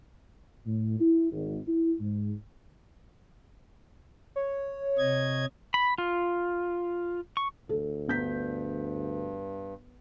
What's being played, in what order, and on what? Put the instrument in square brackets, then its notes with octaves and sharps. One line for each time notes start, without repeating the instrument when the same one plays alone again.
[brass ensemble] A2
E4
G#1
E4
G#2
[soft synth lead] C#5
[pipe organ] C3 D#5 G#6
[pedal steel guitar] B5
F4
C#6
[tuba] D2 [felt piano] A4
[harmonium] G2 [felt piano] B3 G6 B6